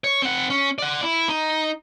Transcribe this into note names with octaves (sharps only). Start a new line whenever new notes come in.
C#5
C4 F#5
C#4
D5 F#5
E4
D#4